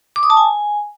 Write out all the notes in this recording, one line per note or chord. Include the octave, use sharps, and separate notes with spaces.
D6
D#6
A5
G#5